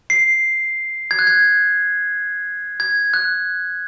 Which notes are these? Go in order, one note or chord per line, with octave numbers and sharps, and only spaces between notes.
C7
G#6
F#6
G#6
G#6
F#6